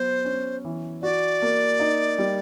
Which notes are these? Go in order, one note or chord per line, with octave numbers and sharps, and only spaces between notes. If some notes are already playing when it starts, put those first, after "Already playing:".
Already playing: F#3 B3 C5
C#4
E3
F#4 D5
A#3
D#4
G3